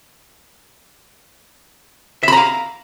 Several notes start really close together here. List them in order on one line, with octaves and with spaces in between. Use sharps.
E5 B5 A#5 F5